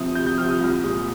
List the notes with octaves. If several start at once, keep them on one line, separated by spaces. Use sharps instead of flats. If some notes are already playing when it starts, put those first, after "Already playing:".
Already playing: C3 F3 C4 D#6
C3 G6
G6
F3 C4 F6
D#6
C2
A#2 G#3